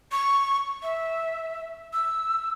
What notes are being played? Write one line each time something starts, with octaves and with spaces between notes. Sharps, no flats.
C#6
E5
E6